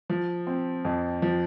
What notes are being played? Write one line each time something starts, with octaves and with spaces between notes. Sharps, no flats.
F3
C4
F2
F3